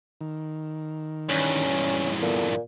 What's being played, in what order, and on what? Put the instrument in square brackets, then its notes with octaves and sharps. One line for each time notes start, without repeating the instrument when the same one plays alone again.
[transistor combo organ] D#3
[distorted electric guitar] E2 G2 [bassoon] C#4
[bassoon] A#2 [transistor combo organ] B3 A4